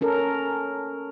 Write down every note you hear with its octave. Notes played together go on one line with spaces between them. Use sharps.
C#4 A4 A#4